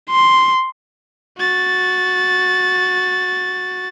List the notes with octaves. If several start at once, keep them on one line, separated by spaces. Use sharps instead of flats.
C6
F#4 A6